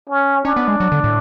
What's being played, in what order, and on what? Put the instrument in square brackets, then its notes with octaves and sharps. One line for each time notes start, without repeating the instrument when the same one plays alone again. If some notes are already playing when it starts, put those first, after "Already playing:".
[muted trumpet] C#4
[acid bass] C#4 [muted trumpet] D4
[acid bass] B3
G#3
F#3
D3
A2